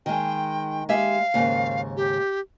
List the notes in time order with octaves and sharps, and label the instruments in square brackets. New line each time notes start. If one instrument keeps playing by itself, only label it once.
[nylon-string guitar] D#3 G#3 [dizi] G5
[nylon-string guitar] G#3 G4 E5 [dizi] F5
[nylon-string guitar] D#2 G#2 C#3
[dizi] G4